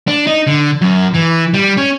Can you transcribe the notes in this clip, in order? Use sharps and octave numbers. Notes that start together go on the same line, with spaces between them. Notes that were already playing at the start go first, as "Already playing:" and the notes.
D4
D#4
D3
F#2
E3
G3
C#4